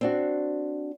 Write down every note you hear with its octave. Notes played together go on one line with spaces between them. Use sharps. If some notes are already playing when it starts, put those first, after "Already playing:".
C4 D4 F#4